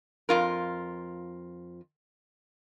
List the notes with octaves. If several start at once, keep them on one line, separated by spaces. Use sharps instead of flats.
F2 F4 A#4